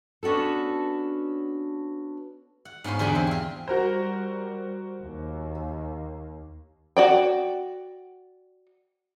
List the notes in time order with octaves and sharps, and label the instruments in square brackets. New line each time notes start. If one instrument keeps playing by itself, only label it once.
[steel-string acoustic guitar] B3 C#4 D4 F#4 A4
[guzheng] F#5
G#2 B3 C#4 F4 C5
E2 D3 G4 G#4 G5 B5
C4 E4
C4 F4
[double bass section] G3 [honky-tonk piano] F#4 A#4 C5
[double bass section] D#2 A#3
[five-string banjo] F#4 D5 G5